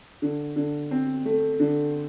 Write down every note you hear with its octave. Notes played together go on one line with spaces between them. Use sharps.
D3
D3
C4
A3
D3